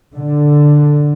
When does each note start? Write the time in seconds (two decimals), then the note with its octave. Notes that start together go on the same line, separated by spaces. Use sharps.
0.15 D3